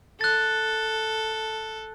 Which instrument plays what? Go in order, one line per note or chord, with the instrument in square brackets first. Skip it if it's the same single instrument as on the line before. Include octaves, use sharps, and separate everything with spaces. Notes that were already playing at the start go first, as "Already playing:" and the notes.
[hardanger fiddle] A4 [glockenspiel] F#6 A6